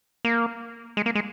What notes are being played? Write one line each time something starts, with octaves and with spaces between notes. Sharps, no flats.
A#3
G#3
A#3
G#3